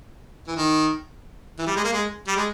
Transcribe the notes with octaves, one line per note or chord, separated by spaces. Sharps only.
E3
D#3
E3
G3
G#3
A#3
G#3
G3
G#3